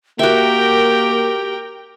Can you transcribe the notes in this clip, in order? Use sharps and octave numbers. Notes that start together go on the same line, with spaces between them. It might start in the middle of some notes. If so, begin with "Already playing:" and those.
A#3 F#4 G4 A#4 E5 G5